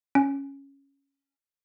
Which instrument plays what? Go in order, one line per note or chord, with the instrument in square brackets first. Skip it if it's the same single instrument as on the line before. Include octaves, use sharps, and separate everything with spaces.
[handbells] C#4